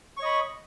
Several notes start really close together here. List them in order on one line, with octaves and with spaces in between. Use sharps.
C#6 C#5 D#5 B5